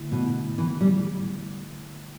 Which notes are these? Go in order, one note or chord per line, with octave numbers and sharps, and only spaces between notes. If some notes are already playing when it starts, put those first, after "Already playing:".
Already playing: D3 A3 E4
B2
E3
G3